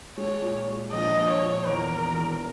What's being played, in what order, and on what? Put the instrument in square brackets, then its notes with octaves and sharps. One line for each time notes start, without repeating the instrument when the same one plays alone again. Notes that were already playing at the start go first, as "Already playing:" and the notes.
[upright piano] G#3 [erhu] C#5
[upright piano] A#2
G#3
[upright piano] A#1 [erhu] D#5
[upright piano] A#1
[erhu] C#5
[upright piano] A#2
[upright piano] E2 [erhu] A#4
[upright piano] E1
E2